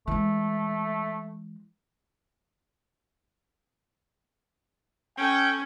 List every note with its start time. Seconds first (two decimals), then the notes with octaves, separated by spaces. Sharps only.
0.07 E3 G#3 A3
5.17 C#4 A4 G5